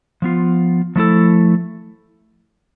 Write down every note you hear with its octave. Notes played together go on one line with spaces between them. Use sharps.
F3 B3 F4
F3 A3 E4 A4